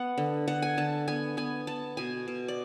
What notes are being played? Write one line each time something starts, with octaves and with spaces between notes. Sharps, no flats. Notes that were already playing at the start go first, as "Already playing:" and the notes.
Already playing: B3 F#5
D3
D3 F#5
G#5
D3 A5
B3 G#5
B3 G#5
B3 A5
B2 G#5
B2
D5